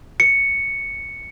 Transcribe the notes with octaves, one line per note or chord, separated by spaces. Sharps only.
C#7